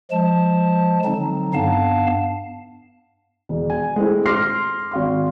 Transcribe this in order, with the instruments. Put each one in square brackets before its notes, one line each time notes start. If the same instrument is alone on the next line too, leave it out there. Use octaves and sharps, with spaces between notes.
[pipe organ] F3 G#3 A5
D3 F#3 C4 D#4
G2 B3 F5 A5
[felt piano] E1
G#5
G#3 A3 C4 E4
C6 D6 F6 A#6 C7
G#1 F5 C6